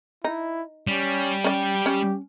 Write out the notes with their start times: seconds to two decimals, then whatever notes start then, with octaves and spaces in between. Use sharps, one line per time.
0.24 D#4 E4
0.87 G3 C#4
1.44 C#4 G4 D5
1.86 C#4